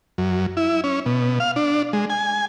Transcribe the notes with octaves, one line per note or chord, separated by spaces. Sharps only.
F#2
E4
C#4
B2
F5
D4
G#3
G#5